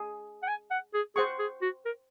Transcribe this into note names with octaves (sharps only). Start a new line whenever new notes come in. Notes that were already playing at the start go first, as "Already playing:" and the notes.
Already playing: G#4
F#5
G#5
F#5
G#4
G#4 C5 F#5 C#6
G#4
F#4
A#4